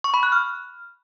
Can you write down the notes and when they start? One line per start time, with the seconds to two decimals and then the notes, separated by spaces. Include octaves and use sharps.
0.04 C#6
0.14 B5
0.23 F#6
0.32 F6